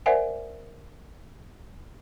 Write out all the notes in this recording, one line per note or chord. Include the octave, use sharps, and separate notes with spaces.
A#4 C5 D5 E5 F#5 G#5